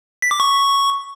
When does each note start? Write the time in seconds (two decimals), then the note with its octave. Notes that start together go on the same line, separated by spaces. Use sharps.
0.22 B6
0.31 D6
0.40 C#6